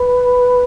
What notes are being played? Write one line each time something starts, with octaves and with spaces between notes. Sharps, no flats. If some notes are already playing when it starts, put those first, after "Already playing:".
Already playing: B4